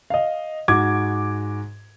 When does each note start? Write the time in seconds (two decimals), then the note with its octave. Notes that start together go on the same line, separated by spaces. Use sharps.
0.10 D#5 F5
0.68 G#2 F#4 D6 G#6